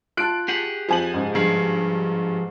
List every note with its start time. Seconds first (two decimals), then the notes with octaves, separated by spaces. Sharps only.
0.17 F4 A5 F#6 D7
0.48 G4 G#4 F#5
0.89 F2 F3 G#5 F#7
1.14 G#2 C#3 G#3
1.35 G2 F3 G#4